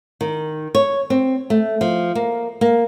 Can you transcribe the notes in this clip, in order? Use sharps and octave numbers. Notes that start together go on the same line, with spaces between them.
D#3
C#5
C4
A3
F3
A#3
A#3